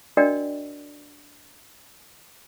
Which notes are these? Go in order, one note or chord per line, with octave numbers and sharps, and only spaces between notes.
D4 F#4 A#4 D5 D#5 G5